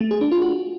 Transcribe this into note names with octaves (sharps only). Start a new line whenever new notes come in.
A3
G#4
D4
F4
F#4